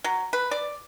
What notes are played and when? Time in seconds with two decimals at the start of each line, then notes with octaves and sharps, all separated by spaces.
0.04 F#3
0.33 B4
0.51 D5